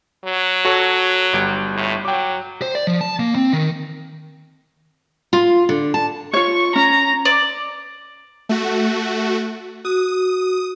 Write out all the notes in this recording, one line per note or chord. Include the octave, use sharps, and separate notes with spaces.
F#3
F#4 A4 C#5
G1 G3 D7
A2
F#3 G5 D6
C5
D5
F3
A5
A#3
C4
D#3
F4
D3
A5
F4 C#5 C#6
C#4 A#5
D5
A3 F#4
F#4 D#6